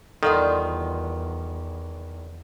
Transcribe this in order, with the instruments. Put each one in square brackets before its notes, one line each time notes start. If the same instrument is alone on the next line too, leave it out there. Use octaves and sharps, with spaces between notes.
[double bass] E2 [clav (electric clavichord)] D#3 [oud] G3 F4 C5 [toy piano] A4 F#5